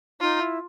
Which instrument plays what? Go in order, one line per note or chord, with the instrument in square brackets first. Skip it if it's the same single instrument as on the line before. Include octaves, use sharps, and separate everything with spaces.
[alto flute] D#4 [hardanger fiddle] F4
[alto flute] E4